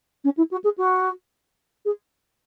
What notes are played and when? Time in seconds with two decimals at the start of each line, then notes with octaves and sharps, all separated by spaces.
0.24 C#4
0.37 E4
0.51 F#4
0.64 G#4
0.77 F#4
1.85 G#4